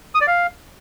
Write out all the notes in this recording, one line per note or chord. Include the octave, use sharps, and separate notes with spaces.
D#6
D5
F5